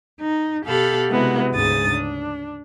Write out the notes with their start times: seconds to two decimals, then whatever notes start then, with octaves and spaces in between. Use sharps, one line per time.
0.20 D#4
0.65 B2 G4 A4 F5 F#5 B5
1.10 C3 G#3 B3 E4 F#4
1.52 D2 G#2 C#3 G#4 D#6 A6
1.90 D4